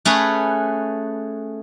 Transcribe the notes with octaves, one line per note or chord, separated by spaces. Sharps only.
A3 C#4 G#4 B4